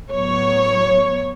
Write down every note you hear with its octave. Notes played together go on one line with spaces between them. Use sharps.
A2 F#3 B3 C#5